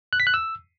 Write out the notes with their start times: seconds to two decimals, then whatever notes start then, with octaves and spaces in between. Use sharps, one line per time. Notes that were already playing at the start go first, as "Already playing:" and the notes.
0.13 F#6
0.20 B6
0.27 F#6
0.34 E6